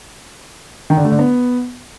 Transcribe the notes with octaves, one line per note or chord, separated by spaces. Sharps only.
D#3
D3
A3
D3
B3